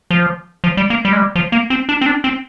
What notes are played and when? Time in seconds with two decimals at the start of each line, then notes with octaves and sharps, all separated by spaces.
0.11 F3
0.64 F3
0.77 G3
0.90 A#3
1.05 G3
1.12 G#3
1.17 G3
1.35 F3
1.52 A#3
1.70 C4
1.89 D4
2.01 C4
2.06 D4
2.24 C4